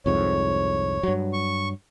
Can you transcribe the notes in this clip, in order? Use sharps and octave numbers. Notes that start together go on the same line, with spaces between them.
C2 F2 G#2 C#5
G2 F#3
C#6